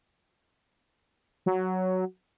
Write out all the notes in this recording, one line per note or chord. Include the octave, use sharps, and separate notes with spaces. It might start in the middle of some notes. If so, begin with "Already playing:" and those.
F#3